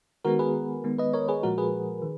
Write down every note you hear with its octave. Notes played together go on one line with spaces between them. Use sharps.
D#3 G#3 B3 F#4 A#4
G#4 B4
D#3 G#3 B3
B4 D#5
A#4 C#5
G#4 B4
A#2 F3 G#3 F#4 A#4
G#4 B4
D#3